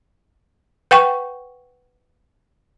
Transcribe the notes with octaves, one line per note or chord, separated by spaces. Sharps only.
B4 F#5 G5 C#6